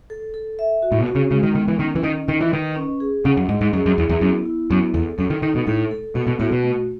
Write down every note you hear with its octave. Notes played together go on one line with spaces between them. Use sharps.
A4
A4
E5
F#4
A2
B2
F#4
C#3
C#3 G#3
D#3
D#3 B3
E3
D#3 C#4
E3
D#3 D#5
D#3 D#5
E3
D#3 B4
C#4
G#4
C#3 F#5
F#2
G#2 D#5
G#2
F#2 G#4
F#2
E2 E4
E2
F#2 B3
E4
F#2 B3
E2 A4
F#2 A4
D#3
D#3 D#4
B2
A2 A4
A4
B2 B3
B2
A2 F#4
B2
A3